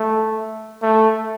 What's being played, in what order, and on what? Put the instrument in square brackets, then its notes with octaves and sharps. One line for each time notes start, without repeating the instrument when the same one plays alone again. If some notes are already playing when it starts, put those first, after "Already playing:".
Already playing: [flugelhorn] A3
A3